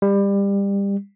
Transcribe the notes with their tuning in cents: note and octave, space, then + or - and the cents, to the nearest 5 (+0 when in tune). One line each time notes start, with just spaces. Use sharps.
G3 +25